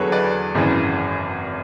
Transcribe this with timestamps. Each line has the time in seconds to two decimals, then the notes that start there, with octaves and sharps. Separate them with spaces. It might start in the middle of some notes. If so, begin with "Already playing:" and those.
Already playing: E2 D3 F#3 G#4 A4 B4 C#5
0.12 B4 D5
0.55 G#1 F#2 C#3 E3